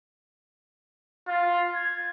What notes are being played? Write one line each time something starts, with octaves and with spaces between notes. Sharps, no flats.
F4
G#6